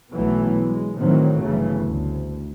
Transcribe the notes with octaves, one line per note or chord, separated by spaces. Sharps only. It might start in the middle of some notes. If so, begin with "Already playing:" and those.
B1 E3 F#3 A3 B3
G#3
A2 D#3 E3 F#3 C4
G1 C#3 E3 A3
D2